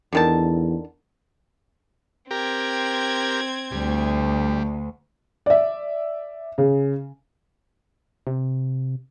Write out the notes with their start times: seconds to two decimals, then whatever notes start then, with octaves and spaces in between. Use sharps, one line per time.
0.13 E2 D3 D#3 A5
2.31 C4 G4 A#4 G#6
3.72 D2 G3
5.46 D5 E5
6.58 C#3
8.27 C3